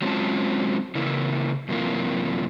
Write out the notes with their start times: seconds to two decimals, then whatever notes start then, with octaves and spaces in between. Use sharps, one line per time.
0.02 F#3 G#3 C4 C#4 F4 A5
0.95 C#3 E3 A#3 E4
1.69 F#2 C3 E3 A#3 F4